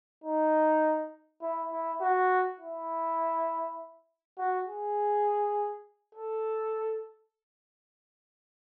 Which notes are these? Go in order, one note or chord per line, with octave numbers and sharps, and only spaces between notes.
D#4
E4
E4
F#4
E4
F#4
G#4
A4